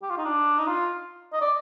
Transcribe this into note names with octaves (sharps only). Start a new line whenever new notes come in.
G4
F4
D#4
D4
D#4
F4
D#5
D5